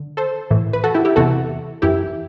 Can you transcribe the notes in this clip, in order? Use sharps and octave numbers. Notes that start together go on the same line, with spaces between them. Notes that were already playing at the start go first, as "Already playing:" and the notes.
Already playing: D3
A4 C5
A2 E3
B4
F#4 A4
E4 G4
E4 G4
E2 C3 E3 F#4 A4
F#2 E3 E4 G4